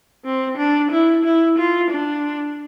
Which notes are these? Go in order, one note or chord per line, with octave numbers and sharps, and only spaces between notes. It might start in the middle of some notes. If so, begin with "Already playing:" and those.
C4
D4
E4
E4
F4
D4